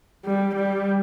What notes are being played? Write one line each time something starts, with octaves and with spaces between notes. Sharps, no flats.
G3
G3